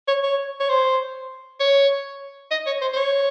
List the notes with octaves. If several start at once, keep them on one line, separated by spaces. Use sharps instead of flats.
C#5
C#5
C#5
C5
C#5
D#5
C#5
C5
C5
C#5